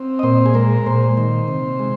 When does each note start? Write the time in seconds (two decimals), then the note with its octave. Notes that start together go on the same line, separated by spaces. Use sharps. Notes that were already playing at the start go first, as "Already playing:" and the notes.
Already playing: C4
0.19 D#5
0.23 A#2 C5
0.46 G#4
0.54 G#3 A#4
0.86 A#2 C5
1.17 D#3
1.48 C3
1.79 G#3